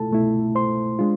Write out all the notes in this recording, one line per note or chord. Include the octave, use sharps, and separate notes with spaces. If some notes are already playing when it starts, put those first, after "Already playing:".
Already playing: C2 B2 A3 E4 F4 A4 A5
C2 B2 A3 E4
C5 C6
G#3 D4 F4